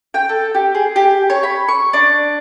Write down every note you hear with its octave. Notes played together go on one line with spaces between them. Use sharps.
G5
A4
G4
G#4
G4
C#5
B5
C#6
D4